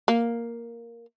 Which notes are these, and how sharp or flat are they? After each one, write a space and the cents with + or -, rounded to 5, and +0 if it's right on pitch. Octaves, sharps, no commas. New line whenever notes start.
A#3 +0